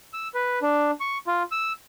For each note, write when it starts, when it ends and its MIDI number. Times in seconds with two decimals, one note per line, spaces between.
0.13 0.28 88
0.35 0.59 71
0.62 0.91 62
1.00 1.18 85
1.27 1.43 65
1.52 1.72 88